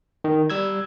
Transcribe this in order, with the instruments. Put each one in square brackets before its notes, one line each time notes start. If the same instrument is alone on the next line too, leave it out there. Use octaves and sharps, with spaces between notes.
[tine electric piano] D#3
G3 E6 G#6